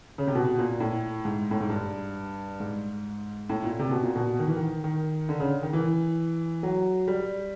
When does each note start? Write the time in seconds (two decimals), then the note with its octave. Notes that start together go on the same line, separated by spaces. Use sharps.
0.18 C#3
0.27 C3
0.35 B2
0.58 A#2
0.80 A2
1.25 G#2
1.51 A2
1.60 G#2
1.70 G2
2.60 G#2
3.50 A2
3.64 A#2
3.79 C3
3.91 B2
4.03 A#2
4.16 B2
4.39 D#3
4.48 E3
4.57 D#3
4.84 D#3
5.29 D3
5.40 C#3
5.63 D#3
5.73 E3
6.63 F#3
7.08 G3